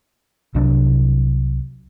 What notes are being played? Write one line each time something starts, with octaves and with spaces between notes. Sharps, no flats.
C2 C3 F#3 D4